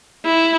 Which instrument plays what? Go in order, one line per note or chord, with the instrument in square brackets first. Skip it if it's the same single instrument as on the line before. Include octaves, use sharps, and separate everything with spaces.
[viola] E4